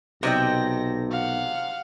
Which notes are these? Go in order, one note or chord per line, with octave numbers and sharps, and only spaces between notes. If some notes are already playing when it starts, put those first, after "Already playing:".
B1 C3 D5 D#5 G5 A#6
F5 F#5